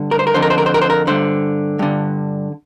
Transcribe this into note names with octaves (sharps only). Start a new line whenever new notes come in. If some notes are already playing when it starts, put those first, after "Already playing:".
Already playing: G2 D3
A#4
C5
A#4
F2 D3 C5
A#4
C5
A#4
C5
A#4
C5
A#4
G2 D3 C5
G2 D3